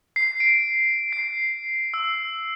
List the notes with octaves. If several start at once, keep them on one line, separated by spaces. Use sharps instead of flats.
C7
D7
C7
E6